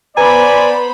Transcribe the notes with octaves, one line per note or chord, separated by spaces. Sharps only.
B3 B4 C5 D5 G#5 A#5 B5